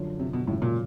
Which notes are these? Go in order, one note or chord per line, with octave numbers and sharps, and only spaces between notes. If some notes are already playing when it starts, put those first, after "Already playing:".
Already playing: F#2 D3 F3
C3
B2
G#1 F#2 A2 C#3 F3
A#2